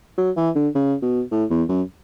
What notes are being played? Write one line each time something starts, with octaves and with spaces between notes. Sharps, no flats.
F#3
E3
D3
C#3
B2
A2
E2
F#2